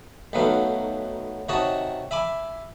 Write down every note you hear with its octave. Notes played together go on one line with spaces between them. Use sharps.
B1 D#3 F#3 A3 B3 F5
C3 D#3 F#4 C#5 D#5 A5
E5 G#5 B5 D6